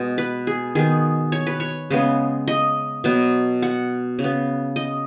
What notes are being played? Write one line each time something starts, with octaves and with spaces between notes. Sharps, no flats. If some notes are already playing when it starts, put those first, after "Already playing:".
Already playing: B2 G#3 B3
B4
G#4
D#3 B3 G#4
C#5
B4
C#5
C#3 G#3 B3
D#5
B2 F#3 B3
F#5
C#3
B3
D#5